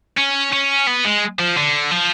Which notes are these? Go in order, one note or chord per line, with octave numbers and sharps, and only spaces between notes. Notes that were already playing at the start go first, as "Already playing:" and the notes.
C#4
C#4
B3
G#3
F3
D3
F3